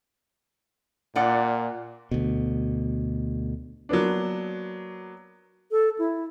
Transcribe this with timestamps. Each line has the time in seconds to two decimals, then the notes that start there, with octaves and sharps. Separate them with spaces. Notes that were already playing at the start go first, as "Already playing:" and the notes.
1.16 A#2 F4 D5 F#5
2.11 D2 B2
3.89 F#3 A#3 B3 D4
5.71 A4
5.99 E4